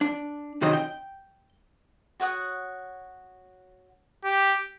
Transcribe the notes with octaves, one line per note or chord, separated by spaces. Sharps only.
D4
C3 D#3 F#3 C4 D#4 D#5
G5
F#4 C#5 F#5 D#6
G4